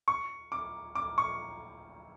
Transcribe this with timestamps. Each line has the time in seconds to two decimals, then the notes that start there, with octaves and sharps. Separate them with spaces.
0.08 C#6
0.52 D6
0.95 D6
1.18 C#6